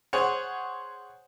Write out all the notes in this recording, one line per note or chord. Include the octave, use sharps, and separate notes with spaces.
G#4 C5 C#5 F#5